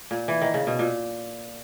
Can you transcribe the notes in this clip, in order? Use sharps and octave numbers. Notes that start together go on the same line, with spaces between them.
A#2
E3
D#3
C#3
B2
A#2